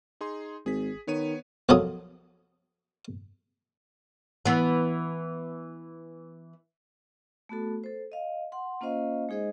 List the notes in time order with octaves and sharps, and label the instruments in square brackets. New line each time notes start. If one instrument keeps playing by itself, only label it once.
[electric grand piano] D#4 G#4 C6
[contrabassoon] G#1 [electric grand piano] G#4 B6
[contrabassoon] D#3 [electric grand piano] B3 C#5 D#7
[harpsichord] B1 F#2 F3 F#3 A4 D#6
[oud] E3 B3
[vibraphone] A3 B3 F#4 A4
A4 C5
D#5 F5
F#5 C6
A#3 C#4 F4 C5 D#5 F5
G#3 D#4 G#4 C5 D#5